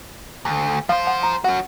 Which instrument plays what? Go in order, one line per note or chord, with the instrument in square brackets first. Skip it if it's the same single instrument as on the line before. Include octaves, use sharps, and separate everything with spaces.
[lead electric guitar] D2
[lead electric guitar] F3 C5 [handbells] F5
[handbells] F#5
A#5
[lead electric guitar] C#4 F#4 [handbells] F#5